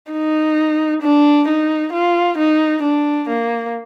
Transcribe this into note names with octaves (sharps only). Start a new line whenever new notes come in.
D#4
D4
D#4
F4
D#4
D4
A#3